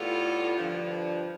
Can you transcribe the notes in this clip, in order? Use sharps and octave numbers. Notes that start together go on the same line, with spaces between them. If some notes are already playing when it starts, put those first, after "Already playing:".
Already playing: A2 G3 B3 F4 A4
G2 D3 F3